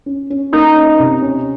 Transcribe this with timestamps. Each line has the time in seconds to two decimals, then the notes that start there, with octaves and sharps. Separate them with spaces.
0.06 C#4
0.30 C#4
0.53 A#3 D#4
0.76 C#4
0.99 C3
1.22 C#4